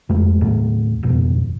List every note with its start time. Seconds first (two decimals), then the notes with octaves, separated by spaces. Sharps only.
0.09 F2 F3 G#3 A3
0.41 D#2 A2 A3
1.03 D#1 G#1 F2 B2